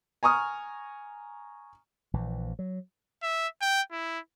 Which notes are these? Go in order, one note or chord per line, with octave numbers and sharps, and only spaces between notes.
G#5 A#5 C#6 D#6 F6
A#1 E3
F#3
E5
G5
E4